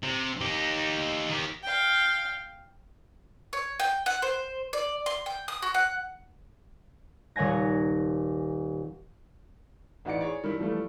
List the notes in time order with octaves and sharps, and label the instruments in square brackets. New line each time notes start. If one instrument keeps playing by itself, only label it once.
[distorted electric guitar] C3
D#4 G4
D#3 G4
[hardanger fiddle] F5 G5
[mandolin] C#5
G5
F#5
C5
D5
C6
G5
D#6
F#4
F#5
[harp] D#1 C#5 F#5 G#5 A#6
[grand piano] A1 D#4 F#4 D5 C#7
G#4 C#5 D5
D#3 G3 D4 E4
E3 F3 G3 A3